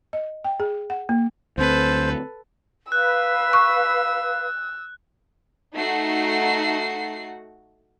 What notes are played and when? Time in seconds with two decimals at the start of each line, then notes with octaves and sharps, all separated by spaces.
0.13 D#5
0.44 G5
0.60 G#4
0.90 F#5
1.09 A#3
1.58 D2 C4 A4 B4 C5
2.92 B4 F5 E6 F#6
3.53 C#6
5.76 A3 D#4 F#4 C7